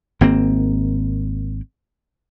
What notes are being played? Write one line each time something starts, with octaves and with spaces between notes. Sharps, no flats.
G#1 A#3 C4